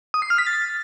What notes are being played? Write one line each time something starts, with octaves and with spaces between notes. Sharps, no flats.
D#6
C7
F6
B6
A6